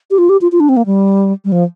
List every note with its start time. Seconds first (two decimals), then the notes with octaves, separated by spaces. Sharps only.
0.11 G4
0.18 F4
0.29 G4
0.41 F4
0.52 F4
0.60 D4
0.69 C4
0.77 A#3
0.86 G3
1.45 G3
1.52 F3